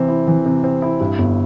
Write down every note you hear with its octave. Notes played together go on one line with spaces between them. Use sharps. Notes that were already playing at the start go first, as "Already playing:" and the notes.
Already playing: C3 E3 C4
E4
E3
C3
C4
E4
G2
G1